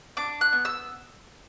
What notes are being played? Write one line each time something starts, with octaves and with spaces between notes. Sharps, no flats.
D4 D6
F#6
B3
E6